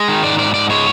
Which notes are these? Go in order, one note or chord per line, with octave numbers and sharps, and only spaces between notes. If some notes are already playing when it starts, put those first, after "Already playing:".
Already playing: G#3
D#3
G#2 D5
G#2 D5
G#2 D5
G#3 C#5